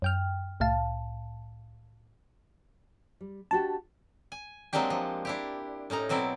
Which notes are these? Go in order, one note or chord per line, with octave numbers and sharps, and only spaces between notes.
F#2 G5 F6
C2 A2 F5 A5
G3
D4 F#4 G4 A5
G#5
F#3 G#3 A#3 C4 D4 G4
F3
D4 E4 G4
A2 C#4 D#4 A#5
B2 F#3 C4 E4 D5